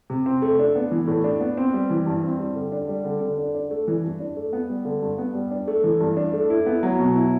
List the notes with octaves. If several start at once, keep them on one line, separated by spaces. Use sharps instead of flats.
C3
C4
A3
D4
B3
E3
A2
D4
B3
C4
G3
E3
G2
C4
G3
D3
D4
G3
D3
D3
D4
D4
A3
E3
G2
D4
A3
B3
G3
D3
G2
B3
G3
D4
A3
E3
G2
D4
A3
E4
B3
F#3
B2
E4